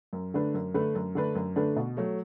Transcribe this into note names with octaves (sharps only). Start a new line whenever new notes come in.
F#2
D3 A3 D4 B4
F#2
D3 A3 D4 B4
F#2
D3 A3 D4 B4
F#2
D3 A3 D4 B4
B2
F#3 A3